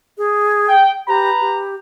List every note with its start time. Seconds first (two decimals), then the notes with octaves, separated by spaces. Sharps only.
0.18 G#4
0.68 G5
1.08 G4 B4 A#5
1.40 G4